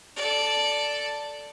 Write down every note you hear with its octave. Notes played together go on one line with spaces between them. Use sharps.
A4 D5